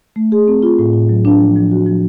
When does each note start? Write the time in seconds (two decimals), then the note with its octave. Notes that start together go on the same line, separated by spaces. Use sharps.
0.16 A3
0.32 G#4
0.48 C4
0.63 F4
0.79 A2
0.93 A2
1.09 F#3
1.25 D4
1.40 F3
1.56 F3
1.71 F#4
1.86 F3